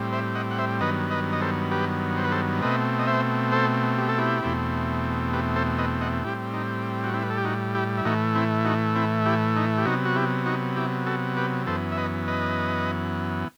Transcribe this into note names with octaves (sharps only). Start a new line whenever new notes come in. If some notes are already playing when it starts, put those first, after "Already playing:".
Already playing: A2 G3 C4
C5 E5
D#5 F#5
F#5
C5 E5
G2 D#3 F#3 B3 B4 D#5
B4 D#5
D#5
A4 C5
G4 B4
C5
B4
A4 C5
B2 A3 C4 B4 D#5
D#5
C5 E5
A4 C5
G4
A4
E4 G4
E2 B2 A3 C4
G4 B4
A4 C5
B4 D#5
D#5 F#5
A2 G3 C4 E4 G4
D#4
F#4
C4 E4
B4
A4
G4
D#4 F#4
E4 G4
E4
A2 E3 A3 D#4 F#4
C4 E4
D#4 F#4
C4 E4
E4 G4
D#4
G4
C3 F#3 B3 D#4 F#4
F#4
E4 G4
D#4 F#4
E4 G4
F#4 A4
G4 B4
F#2 E3 B3 A4 C5
E5
B4 D#5
B4 D#5